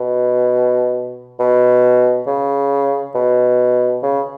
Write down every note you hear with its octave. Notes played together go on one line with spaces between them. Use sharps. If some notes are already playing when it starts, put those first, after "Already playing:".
Already playing: B2
B2
C#3
B2
C#3